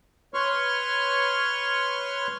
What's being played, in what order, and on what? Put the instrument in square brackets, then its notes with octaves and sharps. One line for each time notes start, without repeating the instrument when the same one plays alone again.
[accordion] B4 C#5 C6 C#6 F6